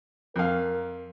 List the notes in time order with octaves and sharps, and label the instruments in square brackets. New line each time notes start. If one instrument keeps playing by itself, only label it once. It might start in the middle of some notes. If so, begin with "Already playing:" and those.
[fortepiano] F2 F5 [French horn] A#4